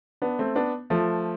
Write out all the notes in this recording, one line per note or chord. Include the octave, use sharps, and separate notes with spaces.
B3 D4
A3 C4
B3 D4
F3 A3